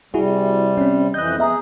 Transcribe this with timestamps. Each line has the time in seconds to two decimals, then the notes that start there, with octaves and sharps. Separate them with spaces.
0.14 C3 G3 E4 F#4 G#4
0.77 C4 C#4
1.14 F2 E3 D#5 F#6 G6
1.39 B3 G#4 E5 A#5